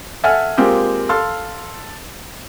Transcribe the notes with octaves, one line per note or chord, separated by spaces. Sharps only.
A4 E5 F#5 G#5 F6
G#3 A#3 C4 F4 G4
A4 F5 C6 F6